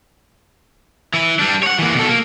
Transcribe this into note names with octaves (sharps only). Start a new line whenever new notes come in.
E3 E4
G3 D4
C#5 F#5
E3 A#3
B2 A4
A#3